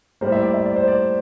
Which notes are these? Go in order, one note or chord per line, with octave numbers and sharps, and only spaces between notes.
A2 G3 A#3 C5
E5
D5
E5
D5
C5
D5